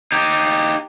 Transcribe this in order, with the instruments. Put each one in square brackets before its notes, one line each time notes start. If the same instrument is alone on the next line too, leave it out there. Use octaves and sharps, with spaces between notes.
[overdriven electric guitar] D#4 G4